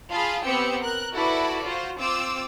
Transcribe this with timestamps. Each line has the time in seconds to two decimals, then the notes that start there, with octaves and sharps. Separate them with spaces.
0.11 F4 G#4 F5 A5 B5
0.44 B3 C4 G4 G5 E6 C#7
0.81 A#4 F#6
1.14 E4 F#4 A4 B4 D5 B5
1.65 F4 F#4 C5
1.99 C4 F4 D6 E6